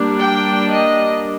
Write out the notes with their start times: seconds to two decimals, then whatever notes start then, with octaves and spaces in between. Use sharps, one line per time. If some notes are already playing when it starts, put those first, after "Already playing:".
Already playing: G3 A#3 D4
0.19 G5
0.72 D#5